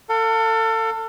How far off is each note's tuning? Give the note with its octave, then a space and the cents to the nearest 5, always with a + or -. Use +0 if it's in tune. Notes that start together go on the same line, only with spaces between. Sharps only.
A4 +30 F5 +35